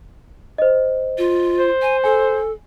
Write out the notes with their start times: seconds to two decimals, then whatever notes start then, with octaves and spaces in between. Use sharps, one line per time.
0.58 C5 D#5
1.18 F4
1.59 C5
1.82 G#5
2.04 A4 G#5